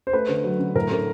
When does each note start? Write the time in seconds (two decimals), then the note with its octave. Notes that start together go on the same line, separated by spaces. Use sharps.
0.07 C5
0.13 A3 B4
0.29 D3
0.44 F#3
0.60 D3
0.75 A2 A#4
0.91 A3